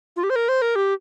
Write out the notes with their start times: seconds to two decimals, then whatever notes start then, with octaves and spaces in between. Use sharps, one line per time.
0.16 F4
0.23 G4
0.30 C5
0.36 A#4
0.48 C5
0.62 A#4
0.75 G4